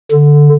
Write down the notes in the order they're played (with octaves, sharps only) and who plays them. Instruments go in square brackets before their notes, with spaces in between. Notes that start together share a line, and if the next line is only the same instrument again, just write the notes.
[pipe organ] D3